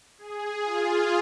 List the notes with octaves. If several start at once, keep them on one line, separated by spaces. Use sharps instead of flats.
G#4
F4